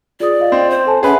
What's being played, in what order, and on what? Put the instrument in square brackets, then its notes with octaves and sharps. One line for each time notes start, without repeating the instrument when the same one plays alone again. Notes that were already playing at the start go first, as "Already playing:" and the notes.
[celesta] F4 G#4 D#6 [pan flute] D5
[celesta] F4 D#5 F5
[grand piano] C4
[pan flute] C5
[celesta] A4 G#5 A5
[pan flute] C#4 [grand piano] G#4 B4 [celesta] C#5 E5 F#5